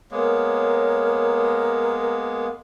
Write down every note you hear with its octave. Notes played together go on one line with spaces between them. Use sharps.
G#3 A#3 B3 A#4 C#5